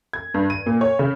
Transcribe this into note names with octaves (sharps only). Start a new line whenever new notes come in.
G#6
G2
D#7
A#2
C#5
C#3